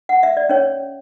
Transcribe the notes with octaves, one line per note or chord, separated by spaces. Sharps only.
F#5
E5
D5
C#4 C#5